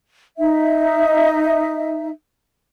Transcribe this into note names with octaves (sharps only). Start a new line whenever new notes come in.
D#4 E5